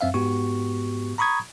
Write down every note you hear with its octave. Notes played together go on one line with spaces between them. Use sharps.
F#2 C4 E5 F5
G#2 B3 F#4 G4 C#6
A#5 B5 C#6 D#6 G#6